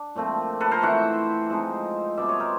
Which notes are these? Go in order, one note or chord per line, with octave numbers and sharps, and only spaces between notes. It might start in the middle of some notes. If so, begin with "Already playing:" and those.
Already playing: D4
A#2 F3 A3 C4
A4 B4
A#4 C5
E3 A3 C4 E4 E5 F#5
F3 G#3 C4 D#4
B2 G3 C4 D5 E5
C#5 D#5
A#4 C5